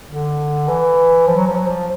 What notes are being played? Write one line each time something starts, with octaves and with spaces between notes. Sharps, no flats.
D3
E3
F3
F#3
F3
F#3
F3